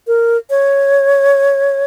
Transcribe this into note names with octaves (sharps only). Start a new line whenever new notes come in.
A#4
C#5